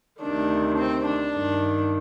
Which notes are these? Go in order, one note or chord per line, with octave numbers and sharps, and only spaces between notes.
D2 C3 D#3 D4
C4
D4
G2 D#3